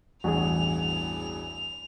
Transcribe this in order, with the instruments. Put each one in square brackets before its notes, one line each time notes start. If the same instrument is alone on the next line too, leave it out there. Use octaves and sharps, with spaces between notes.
[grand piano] A1 E2 G2 [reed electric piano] F#4 G#4 [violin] F7